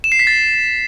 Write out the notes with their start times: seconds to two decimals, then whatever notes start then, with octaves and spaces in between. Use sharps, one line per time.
0.04 E7
0.12 C7
0.19 B6
0.27 A6